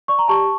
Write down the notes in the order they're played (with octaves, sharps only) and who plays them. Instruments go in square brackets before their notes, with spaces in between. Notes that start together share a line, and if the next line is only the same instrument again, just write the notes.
[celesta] D5 C#6
A#5
G4 A5 C#6